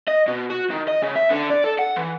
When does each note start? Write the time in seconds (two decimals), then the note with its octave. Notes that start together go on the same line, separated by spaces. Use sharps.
0.08 D#5
0.27 B2
0.50 F#4
0.70 D#3
0.88 D#5
1.02 C#3
1.16 E5
1.31 D3
1.51 D5
1.65 A4
1.79 F#5
1.96 E3